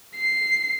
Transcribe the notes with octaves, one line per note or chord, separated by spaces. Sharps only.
C7